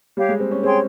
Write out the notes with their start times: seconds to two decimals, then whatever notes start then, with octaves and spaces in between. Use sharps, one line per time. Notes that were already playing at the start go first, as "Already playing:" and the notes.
0.17 G3 G4 C#5 F5
0.29 G#3
0.40 C4
0.51 C#4
0.63 C4 G#4 C#5 G5 C6